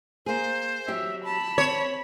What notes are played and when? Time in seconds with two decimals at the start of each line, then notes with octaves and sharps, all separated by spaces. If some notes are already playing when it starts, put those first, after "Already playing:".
0.26 A#3 G#4 C5
0.88 F#3 G4 E5
1.25 A5 B5
1.58 C4 C#5